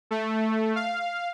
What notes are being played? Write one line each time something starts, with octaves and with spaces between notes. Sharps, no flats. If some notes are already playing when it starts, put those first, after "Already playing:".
A3
F5